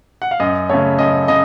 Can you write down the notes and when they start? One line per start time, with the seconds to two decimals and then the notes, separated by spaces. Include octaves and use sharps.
0.22 F#5
0.31 F5
0.40 F#2 D#5
0.69 C#3 A3 C#5
0.99 F#2 D#5
1.28 C#3 D#5